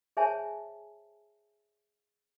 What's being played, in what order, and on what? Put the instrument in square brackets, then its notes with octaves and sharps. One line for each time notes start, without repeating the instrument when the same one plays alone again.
[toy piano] G#4 C5 C#5 E5 G#5 A5